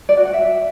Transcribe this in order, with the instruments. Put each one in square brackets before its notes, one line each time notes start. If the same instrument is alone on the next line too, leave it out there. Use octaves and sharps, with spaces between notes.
[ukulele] D5
F#4
F#5
E5